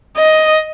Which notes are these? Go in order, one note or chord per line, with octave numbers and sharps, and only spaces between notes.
D#5